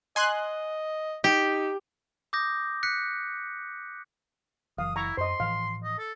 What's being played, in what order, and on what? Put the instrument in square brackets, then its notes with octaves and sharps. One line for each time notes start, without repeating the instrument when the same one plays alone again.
[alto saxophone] D#5 [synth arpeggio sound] G#5 C6 F#6
[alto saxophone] D#4 [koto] G4
[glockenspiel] D6 D#6 G6 A#6
F#6 B6 C#7
[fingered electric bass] F#1 E3 F#3 [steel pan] F5 [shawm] D#6
[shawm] E4 [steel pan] A#5 C#6
[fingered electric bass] F#2 [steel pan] C5 D#5 [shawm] C6
[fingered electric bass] A2 E3 F3 [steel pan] F5
[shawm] D#5
A4